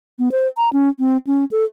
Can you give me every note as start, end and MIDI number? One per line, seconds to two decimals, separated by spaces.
0.19 0.29 59
0.32 0.47 72
0.57 0.69 82
0.73 0.89 61
0.99 1.17 60
1.27 1.45 61
1.51 1.64 69